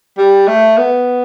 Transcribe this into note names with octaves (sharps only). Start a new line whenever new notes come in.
G3
A3
B3